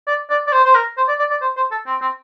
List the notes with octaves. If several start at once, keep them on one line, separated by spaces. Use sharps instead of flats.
D5
D5
D5
C5
C5
A#4
C5
D5
D5
D5
C5
C5
A4
C4
C4